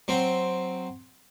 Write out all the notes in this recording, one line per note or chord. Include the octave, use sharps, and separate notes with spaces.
F#3 C4